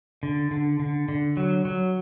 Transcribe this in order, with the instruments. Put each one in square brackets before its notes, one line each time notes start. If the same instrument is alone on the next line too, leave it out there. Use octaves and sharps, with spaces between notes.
[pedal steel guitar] D3
D3
D3
D3
F#3
F#3